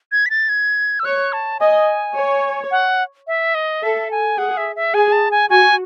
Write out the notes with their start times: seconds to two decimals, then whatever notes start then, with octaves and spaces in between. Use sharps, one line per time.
0.12 G#6
0.26 B6
0.30 A6
0.49 G#6
0.99 E6
1.04 C#5 F#6
1.33 A5
1.60 D#5 G#5
2.16 C#5
2.71 F#5
3.27 E5
3.55 D#5
3.83 A4 E5
4.11 G#5
4.38 G#4 F#5
4.57 E5
4.76 E5
4.94 G#4 G#5
5.12 A5
5.31 G#5
5.50 F#4 G#5